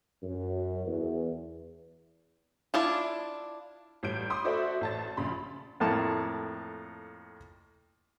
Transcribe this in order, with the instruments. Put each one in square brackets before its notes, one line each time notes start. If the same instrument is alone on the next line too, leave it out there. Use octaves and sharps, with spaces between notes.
[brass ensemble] F#2
E2
[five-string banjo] D4 E4 F4
[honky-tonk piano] A1 G3 G6 D7
B5 C6 D6 D#6
F#4 A4 C5 D5 E5
A1 A5 A6
A#1 C#3 B5 C6
[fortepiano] F2 A2 A#3 A5